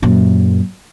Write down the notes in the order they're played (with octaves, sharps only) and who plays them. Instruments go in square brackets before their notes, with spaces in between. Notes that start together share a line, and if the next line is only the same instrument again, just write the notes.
[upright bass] F#2 A#2